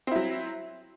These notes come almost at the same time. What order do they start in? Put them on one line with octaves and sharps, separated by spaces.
C4 E4 F#3